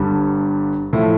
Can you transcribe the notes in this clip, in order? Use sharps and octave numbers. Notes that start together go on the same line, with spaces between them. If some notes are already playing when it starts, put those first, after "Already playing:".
Already playing: G1 G2 D3 G3
A2 F3 A3 E4